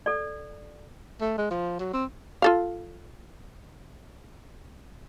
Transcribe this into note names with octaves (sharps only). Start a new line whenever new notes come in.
A4 D5
A3
G#3
F3
F#3
C4
F4 A4 F5